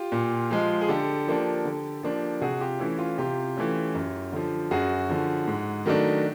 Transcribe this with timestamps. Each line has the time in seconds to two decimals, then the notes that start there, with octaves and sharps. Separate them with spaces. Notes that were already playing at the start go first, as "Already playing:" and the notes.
Already playing: F4 G4
0.12 A#2
0.51 F3 G#3
0.81 G#4
0.88 D3 G4 A4
1.27 F3 A#3 D4
1.65 D3
2.03 F3 A#3 D4
2.41 C3 F#4 G#4
2.61 F4 G4
2.79 E3 A3 C#4 E4
2.98 F4
3.18 C3 F4 G4
3.56 E3 A3 C#4
3.95 F#2
4.32 D3 F3
4.71 F#2 F#4 G#4
5.09 D3 F3
5.47 G#2
5.86 D#3 F#3 A3 D4